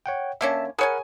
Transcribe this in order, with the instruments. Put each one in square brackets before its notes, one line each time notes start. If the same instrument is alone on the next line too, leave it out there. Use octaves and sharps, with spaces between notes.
[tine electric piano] C#5 F#5 G5
[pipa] D3 A#3 C#4 [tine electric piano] E5 A5
[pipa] G#4 C#5 G#5 [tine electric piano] A#4 F#5 B5